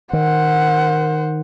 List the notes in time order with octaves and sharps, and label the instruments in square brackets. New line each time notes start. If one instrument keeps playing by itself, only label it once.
[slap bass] D#3 [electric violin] C5 F#5